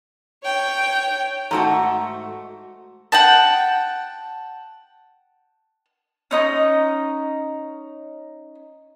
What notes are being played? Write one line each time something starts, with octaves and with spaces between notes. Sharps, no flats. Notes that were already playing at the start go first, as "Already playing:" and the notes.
C#5 G5
G#2 A3 F#4 A5 A#5
F#5 G5 A5
C#4 D#4 D#6